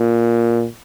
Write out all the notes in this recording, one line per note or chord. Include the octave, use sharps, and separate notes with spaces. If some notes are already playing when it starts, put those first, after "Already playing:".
Already playing: A#2